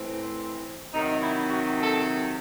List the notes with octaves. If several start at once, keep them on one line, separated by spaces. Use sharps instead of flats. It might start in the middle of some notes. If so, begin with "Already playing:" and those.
Already playing: A2 E3 C4
C3 D#3 F#3 D#4
E4
F#4
A4